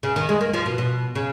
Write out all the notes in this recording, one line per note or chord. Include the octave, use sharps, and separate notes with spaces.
C#3
D#3
G#3
A#3
F3
B2
B2
C#3